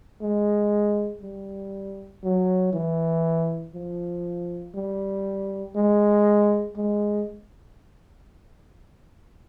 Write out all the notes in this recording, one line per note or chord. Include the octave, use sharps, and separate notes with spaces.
G#3
G3
F#3
E3
F3
G3
G#3
G#3